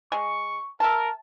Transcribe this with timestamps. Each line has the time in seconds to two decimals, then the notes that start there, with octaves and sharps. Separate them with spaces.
0.12 G#3 C#6
0.80 A#4 E5 A5